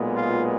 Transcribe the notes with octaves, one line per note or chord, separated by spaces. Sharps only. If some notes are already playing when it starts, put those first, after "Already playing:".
Already playing: B1 A#2 G#3 B3
F4